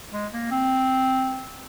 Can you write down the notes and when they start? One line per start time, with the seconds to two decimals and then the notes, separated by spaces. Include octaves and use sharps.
0.13 G#3
0.33 A#3
0.51 C4